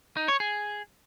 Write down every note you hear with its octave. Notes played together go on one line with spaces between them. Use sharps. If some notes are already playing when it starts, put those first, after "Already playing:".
D#4
C#5
G#4